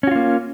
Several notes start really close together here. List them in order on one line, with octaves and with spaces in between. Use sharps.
C#4 F#4 F4 A#3